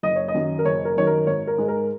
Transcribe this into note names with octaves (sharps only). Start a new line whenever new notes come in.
F#1 D#5
C#5
D#5
F#2 D#3 F#3
A#4
F#1 C#5
A#4
F#2 D#3 F#3 C#5
A#4
G#1 C#5
A#4
G#2 G#3
A#4